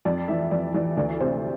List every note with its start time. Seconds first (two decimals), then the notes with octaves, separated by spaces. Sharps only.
0.05 F2 D5
0.28 E3 E5
0.51 F2 D5
0.74 E3 D5
0.97 D2 D5
1.20 C3 C5